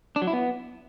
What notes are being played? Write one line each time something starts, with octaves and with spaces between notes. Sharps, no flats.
D4
F#3
E4
B3